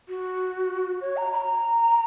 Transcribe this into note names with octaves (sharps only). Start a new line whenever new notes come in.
F#4
C#5
A#5
B5
A#5